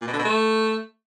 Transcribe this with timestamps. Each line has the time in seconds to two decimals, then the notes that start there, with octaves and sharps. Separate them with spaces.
0.01 A#2
0.07 B2
0.13 D3
0.19 B2
0.25 A3